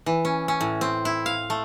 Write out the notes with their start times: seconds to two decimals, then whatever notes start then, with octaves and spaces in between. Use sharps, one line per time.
0.06 E3
0.25 C#4
0.48 C#4
0.61 A2
0.81 C4
1.05 E4
1.26 F5
1.50 A3